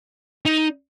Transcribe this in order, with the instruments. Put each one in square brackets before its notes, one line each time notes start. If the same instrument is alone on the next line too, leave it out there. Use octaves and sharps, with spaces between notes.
[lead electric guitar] D#4